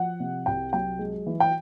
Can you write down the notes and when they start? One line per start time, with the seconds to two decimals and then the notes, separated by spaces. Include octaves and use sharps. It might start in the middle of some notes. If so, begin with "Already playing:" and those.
Already playing: F3 F#5
0.20 C3
0.46 C2 G5
0.73 F#3 G5
0.99 G#3
1.26 E3
1.40 G5